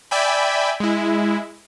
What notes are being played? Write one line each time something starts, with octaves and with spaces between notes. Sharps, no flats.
D5 E5 G5 G#5 B5
G#3 E4